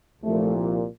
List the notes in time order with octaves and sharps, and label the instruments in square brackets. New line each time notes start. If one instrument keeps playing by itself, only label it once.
[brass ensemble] C2 A#2 F3 A3